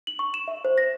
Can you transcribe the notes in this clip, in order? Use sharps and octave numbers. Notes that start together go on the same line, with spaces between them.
F#7
C#6
E7
E5
C5
A#6